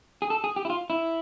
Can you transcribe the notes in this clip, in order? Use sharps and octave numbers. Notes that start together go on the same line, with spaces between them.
G#4
A4
G#4
G4
E4
F4
E4